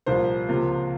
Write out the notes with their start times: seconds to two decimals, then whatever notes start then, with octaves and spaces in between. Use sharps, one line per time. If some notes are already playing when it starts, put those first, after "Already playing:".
0.06 C2 A#2 F3 A#3 C5
0.48 C#2 C3 F3 A#3 F4